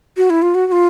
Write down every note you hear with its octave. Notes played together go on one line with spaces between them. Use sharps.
F#4
E4
F4
F#4
F#4
F4